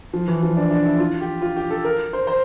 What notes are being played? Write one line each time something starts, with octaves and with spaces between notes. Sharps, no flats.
F3
E3
F3
D4
D4
E4
F4
G4
F4
G4
A4
A#4
C5
C5